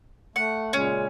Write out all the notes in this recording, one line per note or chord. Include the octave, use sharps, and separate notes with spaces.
A3 F#5
A#2 C#3 G#3 C#4